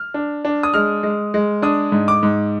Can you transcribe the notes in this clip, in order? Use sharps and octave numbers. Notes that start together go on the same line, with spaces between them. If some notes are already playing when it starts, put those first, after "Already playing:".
Already playing: F6
D4
D4
D#6
G#3 F6
G#3
G#3
D4 D#6
G#2
D6
G#2